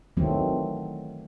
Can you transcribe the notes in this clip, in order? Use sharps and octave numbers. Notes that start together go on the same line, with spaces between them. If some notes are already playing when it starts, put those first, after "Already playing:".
D#3 E3 F#3 A3 C4